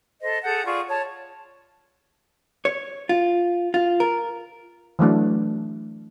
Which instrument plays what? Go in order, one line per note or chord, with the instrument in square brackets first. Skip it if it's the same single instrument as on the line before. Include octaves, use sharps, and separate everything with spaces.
[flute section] A4 C5 D#5
G#4 A4 F#5 G6
F4 G#4 D5 C#6
C#5 A5
[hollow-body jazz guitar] C#5
F4
F4
A#4
[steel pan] E3 F#3 A3 D4